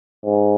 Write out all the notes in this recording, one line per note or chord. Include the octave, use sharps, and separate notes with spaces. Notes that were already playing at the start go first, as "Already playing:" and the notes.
G#2